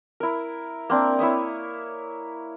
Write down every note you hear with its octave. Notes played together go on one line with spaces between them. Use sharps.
E4 A#4
A#3 C4 D4
E4 C#5 E5 D#6